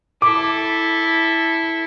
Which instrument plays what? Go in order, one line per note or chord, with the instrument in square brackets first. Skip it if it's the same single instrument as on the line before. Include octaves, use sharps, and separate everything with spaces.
[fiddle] E4 A4 [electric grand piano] D6